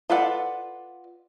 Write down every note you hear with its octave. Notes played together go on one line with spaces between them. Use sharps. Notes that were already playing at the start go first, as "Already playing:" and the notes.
F4 A4 B4 D5 F#5